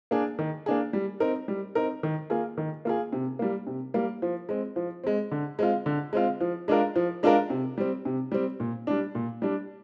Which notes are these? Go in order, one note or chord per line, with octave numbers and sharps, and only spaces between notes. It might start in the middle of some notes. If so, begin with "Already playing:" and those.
A#3 D4 G#4
D#3
A#3 D4 G#4
G3
C4 D#4 A#4
G3
C4 D#4 A#4
D#3
A#3 F4 G#4
D#3
A#3 F4 G#4
C3
G3 A#3
C3
G3 A#3
F3
G#3 C4
F3
G#3 C4
D3
G#3 C4 F4
D3
G#3 C4 F4
F3
G#3 D4 F4 A#4
F3
G#3 D4 F4 A#4
C3
G3 C4
C3
G3 C4
A#2
G3 D4
A#2
G3 D4